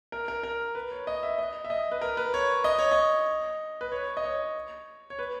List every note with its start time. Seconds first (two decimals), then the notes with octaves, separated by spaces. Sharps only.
0.12 A#4
0.28 A#4
0.43 A#4
0.75 B4
0.92 C#5
1.07 D#5
1.23 E5
1.38 D#5
1.65 E5
1.70 D#5
1.91 B4
2.01 A#4
2.17 B4
2.34 C#5
2.64 D#5
2.79 C#5
2.92 D#5
3.81 B4
3.92 C#5
4.17 D#5
4.24 C#5
5.10 C#5
5.19 B4